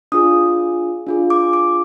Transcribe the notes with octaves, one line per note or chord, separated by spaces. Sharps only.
D4 F4 G#4 D#6
D4 F4 G#4
D6
D6